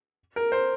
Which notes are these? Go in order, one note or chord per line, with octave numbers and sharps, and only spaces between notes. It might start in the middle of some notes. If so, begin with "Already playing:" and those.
A#4
C5